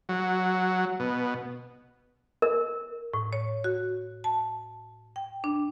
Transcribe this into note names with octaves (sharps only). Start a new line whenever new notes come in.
F#3
B2
A#4
A2
C#5
F#4
A5
G5
D4